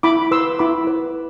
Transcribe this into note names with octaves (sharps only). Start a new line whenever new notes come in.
E4 B5 D6
B4 C6 E6
E4 B5 D6
B4